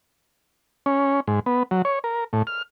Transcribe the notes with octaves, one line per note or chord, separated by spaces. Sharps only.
C#4
G#2
B3
F#3
C#5
A#4
A2
F6